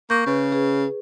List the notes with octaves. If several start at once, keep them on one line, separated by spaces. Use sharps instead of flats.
A#3 C#6 G6
C#3 B4
G#4 B4